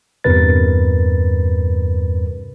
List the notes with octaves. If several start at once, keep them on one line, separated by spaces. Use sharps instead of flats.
E2 G2 C3 A#4 B4 A6